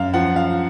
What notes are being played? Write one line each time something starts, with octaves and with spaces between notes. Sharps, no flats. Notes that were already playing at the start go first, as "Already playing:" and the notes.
Already playing: F#2 F5
F3 F#5
F5